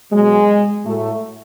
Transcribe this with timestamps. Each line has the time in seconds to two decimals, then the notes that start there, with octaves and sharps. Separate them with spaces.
0.12 B2 F#3 G#3
0.85 A2 F#3 A3